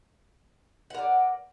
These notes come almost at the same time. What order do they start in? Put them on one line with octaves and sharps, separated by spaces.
F#5 A#4 D5